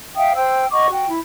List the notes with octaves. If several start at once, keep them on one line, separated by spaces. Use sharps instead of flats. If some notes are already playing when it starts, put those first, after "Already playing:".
E5 F5 G5 D#6
C5 G5 E6
D#5 F#5 C#6 D6
F#4 G5
E4